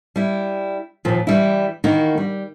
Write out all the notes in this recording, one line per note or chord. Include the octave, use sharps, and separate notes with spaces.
G3 E4
D#2 A#2 F3
E3 G3 E4
D#3 E3 A#3 D#4 F#4
G3